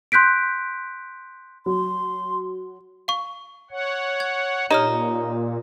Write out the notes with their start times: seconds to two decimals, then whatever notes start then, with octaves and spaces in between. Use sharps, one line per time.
0.12 C6 F#6 G6 B6 D7
1.66 F#3 C6
3.08 F5 C#6
3.71 C#5 F#5
4.20 G#6
4.71 A#2 D#4 G4 C#5 F6